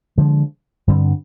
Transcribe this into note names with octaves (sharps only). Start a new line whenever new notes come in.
D3 F3 G#3
G2 D3 G3 C4